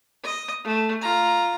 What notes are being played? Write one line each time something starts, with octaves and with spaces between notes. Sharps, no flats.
D#5
A3
F4 A#5